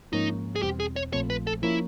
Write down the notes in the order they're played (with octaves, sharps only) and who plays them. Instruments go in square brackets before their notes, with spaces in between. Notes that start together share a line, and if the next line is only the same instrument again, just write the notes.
[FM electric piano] G#2 F3 A#3 C#4 [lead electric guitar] D#4
[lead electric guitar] G#4
[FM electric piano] E2 B2 G3 C4 [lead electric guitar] G4
[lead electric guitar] G#4
C#5
[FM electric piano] A#1 A#2 F3 A3 C4 [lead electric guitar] C#5
[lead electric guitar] B4
A4
[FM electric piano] F3 A#3 C#4 [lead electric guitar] E4